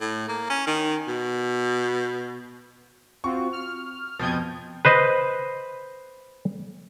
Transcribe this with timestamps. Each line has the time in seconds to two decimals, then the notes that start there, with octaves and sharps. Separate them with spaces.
0.01 A2
0.28 A#3
0.50 C#4
0.67 D#3
1.08 B2
3.24 C4 F4 F#4 C#6
3.52 F6
4.19 F2 B2 F3 D#6 G6 G#6
4.85 B4 C5 D#5